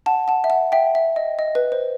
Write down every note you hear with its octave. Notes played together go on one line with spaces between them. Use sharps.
F#5 A5
F#5 A5
E5
F#5
E5 G5
E5
D#5
D#5
B4
C5